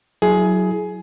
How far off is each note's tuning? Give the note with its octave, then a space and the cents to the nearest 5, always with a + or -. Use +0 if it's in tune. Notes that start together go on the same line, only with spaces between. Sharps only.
F#3 +0 E4 +0 G#4 +20